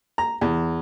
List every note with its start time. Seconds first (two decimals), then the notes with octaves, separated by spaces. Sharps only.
0.18 A#5
0.41 E2